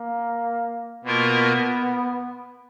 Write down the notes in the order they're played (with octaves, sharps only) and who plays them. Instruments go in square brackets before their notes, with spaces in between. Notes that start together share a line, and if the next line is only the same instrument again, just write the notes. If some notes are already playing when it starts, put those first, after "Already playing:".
Already playing: [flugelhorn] A#3
[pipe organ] B2 A#3 F4 A#4 [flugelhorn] B3